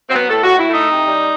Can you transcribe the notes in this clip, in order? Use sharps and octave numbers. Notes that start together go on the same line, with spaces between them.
F#3 C4
B3
A2 A4
F#4
A2
E4
A3 D#4
C3
G3